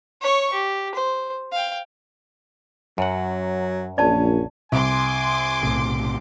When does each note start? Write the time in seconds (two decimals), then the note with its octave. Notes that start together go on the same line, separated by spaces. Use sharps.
0.22 C#5 C#6
0.53 G4
0.95 C5
1.52 F5 G5
2.98 F#2 F#3 F#5
3.98 A#1 C#4 D5 A5
4.72 C2 G#5 C6 D6
5.63 B1 A2 C3